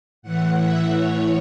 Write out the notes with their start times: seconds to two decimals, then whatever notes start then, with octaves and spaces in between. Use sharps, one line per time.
0.22 A2 E3 F#5
0.58 E5
0.93 A2 E3 C#5